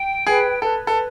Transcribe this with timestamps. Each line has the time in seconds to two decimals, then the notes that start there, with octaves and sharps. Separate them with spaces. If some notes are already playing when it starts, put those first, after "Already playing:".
Already playing: G5
0.27 G#4 B4
0.62 A4 B4
0.87 A4